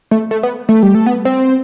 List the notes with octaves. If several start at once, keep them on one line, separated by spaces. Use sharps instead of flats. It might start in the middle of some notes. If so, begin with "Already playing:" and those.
A3
A3
B3
A3
G3
A3
B3
C4